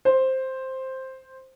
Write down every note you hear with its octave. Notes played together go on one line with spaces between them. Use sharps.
C5